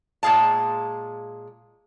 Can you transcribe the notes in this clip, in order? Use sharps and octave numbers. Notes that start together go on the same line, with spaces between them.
A#2 G#3 G#4 F5 A5